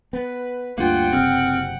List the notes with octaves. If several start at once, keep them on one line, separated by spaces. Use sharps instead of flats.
B3 B4
D2 G2 A#3 F4 F#5 G5
F#1 C3 C4 F6